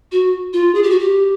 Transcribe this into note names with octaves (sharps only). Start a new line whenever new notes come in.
F#4
F4
G#4
G4
F#4
G4